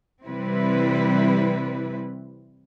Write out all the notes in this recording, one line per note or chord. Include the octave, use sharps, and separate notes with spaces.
C3 E3 G3 C4 E4 B4